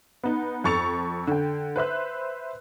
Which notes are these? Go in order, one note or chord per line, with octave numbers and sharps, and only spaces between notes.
B3 D#4
F2 A4 C#6 A6 C#7 F7
D3 G5
B4 C5 E5 F#6